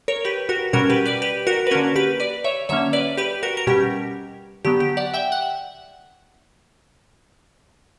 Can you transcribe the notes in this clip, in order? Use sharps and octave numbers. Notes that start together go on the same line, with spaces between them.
A#4 C#5
G4 B4
F#4 A#4
B2 G3 C#4 F#4 A#4
G4 B4
B4 D5
G4 B4
F#4 A#4
B4
D3 A#3 C#4 F#4 A#4
G4 B4
B4 D5
C#5 E5
D3 F#3 A#3 C#4 C#5 E5
B4 D5
G4 B4
F#4 A#4
A#4
B2 G3 C#4 G4
D3 F#3 B3 G4
G4
D5 F#5
E5 G5
F#5